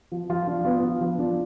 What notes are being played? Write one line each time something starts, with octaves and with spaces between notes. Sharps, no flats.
F3
F3 F4
D4
B3 F4
F3
F3
D4